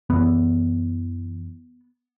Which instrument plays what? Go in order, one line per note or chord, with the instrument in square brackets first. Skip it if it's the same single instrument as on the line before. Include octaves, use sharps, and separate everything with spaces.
[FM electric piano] F#2 E3 [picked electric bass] B3